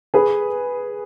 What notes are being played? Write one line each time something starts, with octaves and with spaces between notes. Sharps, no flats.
G#4 B4